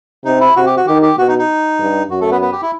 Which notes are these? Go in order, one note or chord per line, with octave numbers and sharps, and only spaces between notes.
C3 D#4
E4
C3 F#4
G4
F#4
D#3 G4
G4
B2 F#4
D#4
D#4
G2
F#2 F#4
A3 A4
B3 B4
B3 B4
G4
E4